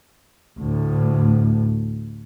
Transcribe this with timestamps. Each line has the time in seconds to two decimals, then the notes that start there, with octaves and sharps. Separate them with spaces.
0.59 D2 A2